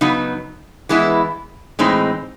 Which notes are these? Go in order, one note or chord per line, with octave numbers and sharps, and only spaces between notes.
C#3 F#3 B3 D#4
E3 G#3 B3 E4
A2 E3 G#3 C4 D#4